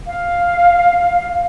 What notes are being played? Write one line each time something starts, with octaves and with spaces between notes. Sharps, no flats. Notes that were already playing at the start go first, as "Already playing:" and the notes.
F5